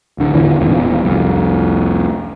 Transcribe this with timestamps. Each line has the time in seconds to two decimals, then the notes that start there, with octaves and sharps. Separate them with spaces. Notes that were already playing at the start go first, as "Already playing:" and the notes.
0.18 D1 D3
0.34 A1 E2 D3 E3
0.60 D#1 E2 G#2
1.04 C2 F2